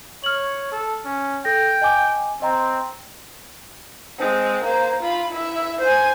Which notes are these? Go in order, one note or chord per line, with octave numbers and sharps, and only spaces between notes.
C#5 F6 F#7
A4
C#4
A4 G5 A#6
D#5 G#5 D6
C4 D#5 G5 A#5
G#3 C4
A#3 C5
F4 B5
E4 E5
C5 G#5